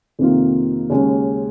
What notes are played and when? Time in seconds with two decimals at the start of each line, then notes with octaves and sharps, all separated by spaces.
0.19 F2 C3 D#3 A#3 F4
0.90 D#2 C#3 G#3 C#4